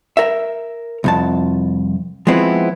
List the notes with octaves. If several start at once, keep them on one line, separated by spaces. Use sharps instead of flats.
A#4 E5
C2 F2 A5
F3 G#3 B3 C4 E4